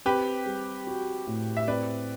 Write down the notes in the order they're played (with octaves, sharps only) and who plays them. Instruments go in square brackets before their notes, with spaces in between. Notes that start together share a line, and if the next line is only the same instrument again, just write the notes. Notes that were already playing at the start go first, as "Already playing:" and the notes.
[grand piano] C4 [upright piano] G4 B4
[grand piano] G3
F#4
A2
[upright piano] E5
[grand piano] C4 [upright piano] B4 D5